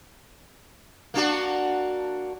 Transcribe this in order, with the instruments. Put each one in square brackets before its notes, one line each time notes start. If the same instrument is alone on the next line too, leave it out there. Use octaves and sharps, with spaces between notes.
[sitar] A#3 D4 F#4